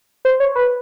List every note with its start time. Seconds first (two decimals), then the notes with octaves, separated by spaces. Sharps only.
0.25 C5
0.40 C#5
0.56 B4